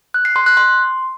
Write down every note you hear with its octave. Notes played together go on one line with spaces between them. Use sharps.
F#6
C7
C6
F#6
C6